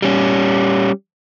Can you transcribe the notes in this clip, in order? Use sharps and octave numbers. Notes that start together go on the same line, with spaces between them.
G3 C#4